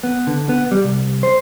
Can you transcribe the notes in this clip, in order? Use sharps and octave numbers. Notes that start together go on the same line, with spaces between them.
B3
D3
B3
G3
C2
C5